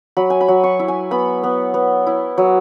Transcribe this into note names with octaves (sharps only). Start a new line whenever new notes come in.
F#3 B5
G#5
B5
F#3
C#6
E4
G#5
B3 B5
B3
B3
E4
F#3